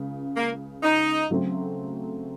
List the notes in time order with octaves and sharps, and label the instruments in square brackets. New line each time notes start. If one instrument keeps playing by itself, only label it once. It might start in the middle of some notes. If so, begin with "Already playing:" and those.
Already playing: [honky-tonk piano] C#2 C#3
[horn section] A#3
D#4
[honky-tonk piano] C#3 F#3 A3 C4